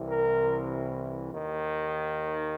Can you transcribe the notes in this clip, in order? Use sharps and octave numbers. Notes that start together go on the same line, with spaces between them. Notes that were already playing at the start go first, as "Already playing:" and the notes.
Already playing: C2 C3 E3
A#4
D#2 D#3